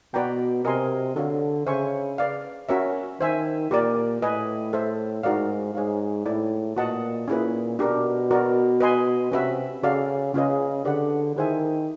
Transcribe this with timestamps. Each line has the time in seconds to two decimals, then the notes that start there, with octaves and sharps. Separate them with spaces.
0.14 B2 F#4 B4 D5 G5 A#5
0.65 C3 A#4 D#5 G#5 C6
1.16 D3 F#4 A4 C#5 F5
1.67 C#3 C5 E5 G#5 C#6
2.18 B4 D5 F5
2.69 C#4 F#4 A#4 C#5 E5
3.20 D#3 C5 E5 G#5
3.71 A#2 G4 A#4 D5
4.22 A2 B4 D#5 G#5
4.73 A4 C5 E5
5.23 G#2 D#4 F#4 A#4 D5 F5
5.75 G#2 G#4 C#5 F5
6.26 A2 E4 A4 D5
6.76 A#2 F#4 B4 D#5 F#5 A5
7.28 A#2 C#4 E4 G#4 B4
7.79 B2 D4 G4 A#4
8.31 F#4 A#4 D5
8.81 B4 D#5 G#5 C6
9.32 C3 C#4 F#4 B4 E5
9.83 C#3 F#4 A4 D5 F5
10.34 C#3 C#4 F4 G#4 B4 D#5
10.85 D3 G4 B4 D5 F#5
11.36 D#3 E4 G#4 C5 E5 G#5